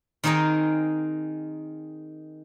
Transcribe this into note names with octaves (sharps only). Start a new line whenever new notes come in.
D#3 C4 D#4 G#4 A#4 D#5